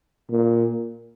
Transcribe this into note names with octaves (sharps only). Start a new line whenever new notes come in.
A#2